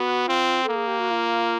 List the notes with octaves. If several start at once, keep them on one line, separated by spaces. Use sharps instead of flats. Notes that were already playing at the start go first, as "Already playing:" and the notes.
Already playing: B3 F#4
C4 F4
A4
A#3
G#4
G4
F#4
F4